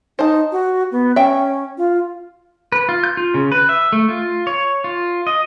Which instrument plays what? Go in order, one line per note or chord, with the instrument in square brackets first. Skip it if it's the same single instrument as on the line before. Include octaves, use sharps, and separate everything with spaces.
[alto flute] D#4 [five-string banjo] C5 A5
[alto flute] F#4
B3
[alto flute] C#4 [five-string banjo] E5 G5
[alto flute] F4
[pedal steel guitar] B4
F4
G6
F4
C#3
B4
E5
A3
F4
C#5
F4
D#5